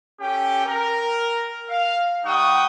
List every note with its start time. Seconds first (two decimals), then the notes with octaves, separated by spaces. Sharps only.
0.21 C#4 G4 A4 G5
0.66 A#4
1.69 F5
2.25 G3 D#4 F#5 G5 C#6 D#6